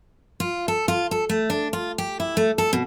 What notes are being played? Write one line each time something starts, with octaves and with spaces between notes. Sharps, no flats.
F4
A4
F4
A4
A3
D4
F4
G4
E4
A3
A4
B2